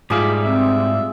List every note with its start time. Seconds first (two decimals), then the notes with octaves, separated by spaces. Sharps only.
0.10 G#2 G3 E4 F4 G#4 D6
0.43 C4 E5